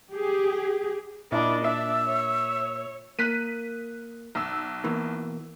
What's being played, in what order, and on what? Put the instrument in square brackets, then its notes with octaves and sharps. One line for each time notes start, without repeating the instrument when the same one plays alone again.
[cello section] G4 G#4
[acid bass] A#2 [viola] D4 D#5 [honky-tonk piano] E4 [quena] B5
[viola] D4 [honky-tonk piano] E5 [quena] E6
[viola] C#5
[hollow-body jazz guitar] A#3 [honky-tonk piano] F#6 B6 D#7
[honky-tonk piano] B1 E6
[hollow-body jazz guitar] B2 E3 A#3